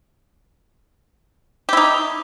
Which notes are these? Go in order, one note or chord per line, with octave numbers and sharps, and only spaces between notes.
D#4 E4 G4